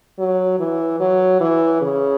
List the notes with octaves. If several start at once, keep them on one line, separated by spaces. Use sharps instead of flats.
F#3
E3
F#3
E3
C#3